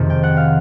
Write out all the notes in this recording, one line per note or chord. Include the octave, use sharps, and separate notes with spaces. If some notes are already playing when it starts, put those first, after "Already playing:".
Already playing: F2 C3 D#3 G#3
G5
F#5
F5